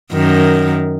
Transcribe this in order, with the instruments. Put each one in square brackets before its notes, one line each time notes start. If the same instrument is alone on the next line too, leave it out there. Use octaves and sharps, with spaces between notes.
[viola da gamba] F#2 D#3